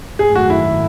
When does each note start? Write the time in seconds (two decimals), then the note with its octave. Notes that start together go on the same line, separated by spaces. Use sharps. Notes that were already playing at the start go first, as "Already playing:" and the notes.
0.19 G#1 F#2 D#3 A3 G#4
0.35 F#4
0.50 E4